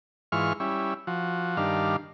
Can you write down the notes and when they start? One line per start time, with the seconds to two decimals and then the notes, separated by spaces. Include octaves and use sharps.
0.32 G#2 E3 F4 C#6 F6
0.60 G3 C#4 E4
1.07 F3 F#4
1.57 G2 D#3 D4 F5